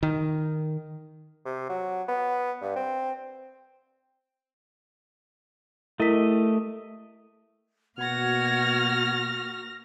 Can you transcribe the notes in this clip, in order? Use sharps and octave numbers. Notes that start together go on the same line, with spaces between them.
D#3
C3
F#3
B3
G2
C4
A3 E4 G4 A#4 D#5 B6
B2 A#3 F#4 F#5 F6 G#6 A#6